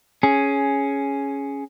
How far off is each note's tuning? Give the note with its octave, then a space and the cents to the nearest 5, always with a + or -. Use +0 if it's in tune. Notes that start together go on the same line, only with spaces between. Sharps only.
C#4 +0 G#4 +10